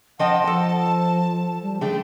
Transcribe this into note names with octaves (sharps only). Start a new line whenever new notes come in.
F3 D#5 F#5 G5 A5
F3 A4
G3
D3 A3 G#4 G5